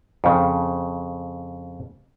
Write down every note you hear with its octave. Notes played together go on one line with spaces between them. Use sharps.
F2 C#3